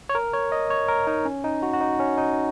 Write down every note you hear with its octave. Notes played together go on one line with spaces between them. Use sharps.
C#5
A#4
C#5
D#5
C#5
A#4
D#4
C#4
D#4
F#4
F#4
D#4
C#4
D#4